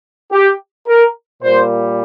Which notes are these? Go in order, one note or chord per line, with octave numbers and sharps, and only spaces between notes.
G4
A#4
A#2 G3 A#3 C5